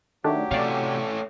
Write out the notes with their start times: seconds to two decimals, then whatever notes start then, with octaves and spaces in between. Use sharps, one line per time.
0.24 D#3 F#3 A3 D4 G4
0.51 C3 A3 C#4 D5 F5